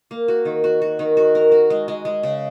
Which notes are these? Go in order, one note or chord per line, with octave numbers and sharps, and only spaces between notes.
A#3
F#4
D#3
F#4
F#4
D#3
F#4
A#4
F#4
G#3
G#3
G#3
C#3